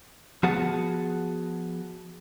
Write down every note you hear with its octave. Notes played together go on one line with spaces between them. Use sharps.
F3 B3 F#4 G#4 F#5 A5